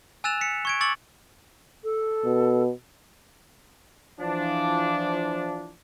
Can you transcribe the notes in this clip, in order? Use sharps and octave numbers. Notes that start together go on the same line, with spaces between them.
G#5 E6 F#6 A6 E7 F7
B6 C#7
C#6 G#6 D7
C#6 D6 E6 A6 C#7 F#7
A4
B2
E3 F3 D4